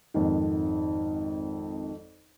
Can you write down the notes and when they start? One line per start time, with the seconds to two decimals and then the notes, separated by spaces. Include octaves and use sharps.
0.14 G#1 F2 D#3